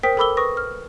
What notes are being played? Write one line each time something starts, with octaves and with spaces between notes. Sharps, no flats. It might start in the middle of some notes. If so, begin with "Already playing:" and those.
A#4 C5 G5 D#6 B6
A4 A#4 B5 D6 E6 G7
B4 C#6 D#6 A#6
F6